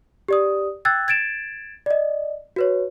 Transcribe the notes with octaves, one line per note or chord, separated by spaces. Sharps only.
G4 D5 D#6
G5 E6 F#6 G#6 A6
G#6 A6 D7 E7
D5 D#5
F#4 B4 C#5